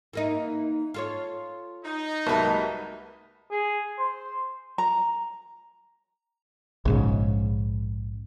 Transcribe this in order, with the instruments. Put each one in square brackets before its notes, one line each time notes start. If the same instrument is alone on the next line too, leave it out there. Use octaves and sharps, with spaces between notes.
[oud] E3 A#3 D#4
F4 A4 C#5
[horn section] D#4
[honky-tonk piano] C2 F#3 B4 [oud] G#3 A#3 [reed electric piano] E5 A5
[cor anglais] G#4
C5
[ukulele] A#5
[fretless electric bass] A#1 G#2 C#3